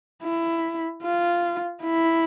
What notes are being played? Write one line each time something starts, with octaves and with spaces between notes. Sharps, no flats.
E4
F4
E4